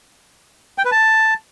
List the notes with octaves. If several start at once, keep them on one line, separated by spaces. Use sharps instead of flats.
G5
B4
A5